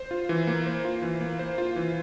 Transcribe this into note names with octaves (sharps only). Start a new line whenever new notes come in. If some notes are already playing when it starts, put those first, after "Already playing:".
Already playing: C5
F4
E3
A#3
C5
F4
E3
A#3
C5
F4
E3